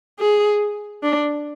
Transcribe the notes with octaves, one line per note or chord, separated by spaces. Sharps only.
G#4
D4